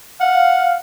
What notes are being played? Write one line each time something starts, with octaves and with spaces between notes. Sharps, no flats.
F5 F#5